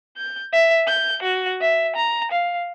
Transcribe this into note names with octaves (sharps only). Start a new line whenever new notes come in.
G6
E5
G6
F#4
E5
A#5
F5